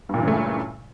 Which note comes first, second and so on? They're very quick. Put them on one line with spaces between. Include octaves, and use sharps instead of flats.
G2 A#2 E3 C#3 A3